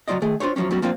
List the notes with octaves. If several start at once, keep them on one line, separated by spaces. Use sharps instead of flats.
C#2 F#3 A#3 F4 D5 D#5
D#3 A3 G#4
D4 F4 A4 C5 C#5
E2 F3 F#3 A#3 C#4
F#3 G3 B3 C#4 F#4
F3 A#3 C4 D4 F4